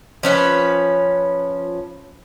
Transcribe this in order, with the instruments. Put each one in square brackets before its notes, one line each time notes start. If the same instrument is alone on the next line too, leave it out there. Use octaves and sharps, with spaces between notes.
[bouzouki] F3 C#4 B4